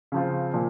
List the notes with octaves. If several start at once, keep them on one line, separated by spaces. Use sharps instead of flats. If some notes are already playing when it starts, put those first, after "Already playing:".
C#3 F3 C4 F4
A#2 F3